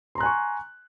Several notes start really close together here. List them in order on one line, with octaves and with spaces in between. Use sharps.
C6 A#5 F#6 G#5 C#6